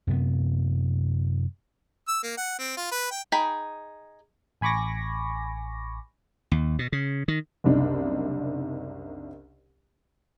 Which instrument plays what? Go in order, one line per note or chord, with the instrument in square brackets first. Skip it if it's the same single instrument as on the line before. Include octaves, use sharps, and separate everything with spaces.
[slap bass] F#2 C3 B3
[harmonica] E6
A#3
F#5
C4
F4
B4
G5
[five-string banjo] D#4 G#4 G5 B5
[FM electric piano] A1 G#5 B5 C#6 D6 A#6
[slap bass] D#2
B2
C#3
D#3
[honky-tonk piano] F#1 C2 D4 D#4